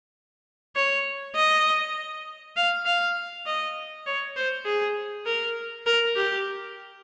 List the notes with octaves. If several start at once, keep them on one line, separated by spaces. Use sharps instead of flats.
C#5
D#5
F5
F5
D#5
C#5
C5
G#4
A#4
A#4
G4